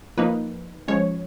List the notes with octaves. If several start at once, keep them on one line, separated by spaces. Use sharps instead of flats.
F3 A#3 D#4 B4
F3 G#3 C#4 C#5